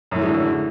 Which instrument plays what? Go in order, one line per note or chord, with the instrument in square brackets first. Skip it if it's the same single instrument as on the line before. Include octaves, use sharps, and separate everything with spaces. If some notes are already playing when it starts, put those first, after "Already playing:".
[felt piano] F#2
A2
E3
G#3
D3